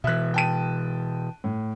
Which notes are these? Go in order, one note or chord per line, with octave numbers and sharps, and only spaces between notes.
B2 E3 E5 F#6
G5 A5 D#7
A2